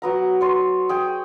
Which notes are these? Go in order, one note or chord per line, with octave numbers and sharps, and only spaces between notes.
F#3 B3 A#5
C#5 C6
G#4 G5